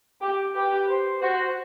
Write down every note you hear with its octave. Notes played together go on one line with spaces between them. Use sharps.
G4
G4 B4
C5
F#4 C5